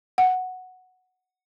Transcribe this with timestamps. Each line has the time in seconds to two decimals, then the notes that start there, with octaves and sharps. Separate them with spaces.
0.18 F#5